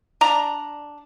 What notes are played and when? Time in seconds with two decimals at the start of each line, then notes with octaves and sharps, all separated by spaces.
0.21 D4 D5 A#5